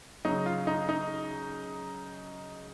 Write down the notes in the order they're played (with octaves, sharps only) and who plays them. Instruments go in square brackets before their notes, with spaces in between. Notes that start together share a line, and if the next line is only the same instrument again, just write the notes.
[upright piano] C#3 F#3 D#4
F4
D#4
D#4